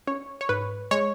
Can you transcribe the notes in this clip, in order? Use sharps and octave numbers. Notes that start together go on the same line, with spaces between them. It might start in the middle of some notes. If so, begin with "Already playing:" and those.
C#4 C#5
C#5
G#2 B4
G#3 C#5